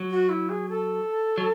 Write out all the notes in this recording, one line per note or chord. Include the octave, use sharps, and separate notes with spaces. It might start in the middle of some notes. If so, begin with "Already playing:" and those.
Already playing: F#3
F#4
E4
G#4
A4
F#3